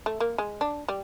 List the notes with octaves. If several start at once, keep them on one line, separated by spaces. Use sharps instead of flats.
A3
A#3
G#3
D4
G3